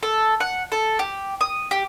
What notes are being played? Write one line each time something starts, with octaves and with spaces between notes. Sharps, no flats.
A4
F#5
A4
G4
D#6
G4